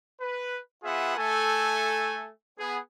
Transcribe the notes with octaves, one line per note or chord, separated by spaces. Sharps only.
B4
B3 F4 G#4 B4 E5 F#5
A3 A4 G#5
B3 G#4